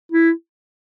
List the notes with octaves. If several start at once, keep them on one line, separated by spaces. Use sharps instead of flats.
E4